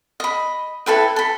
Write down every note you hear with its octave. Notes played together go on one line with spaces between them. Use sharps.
D#5 B5
E4 A4 B4 G5
A4 B5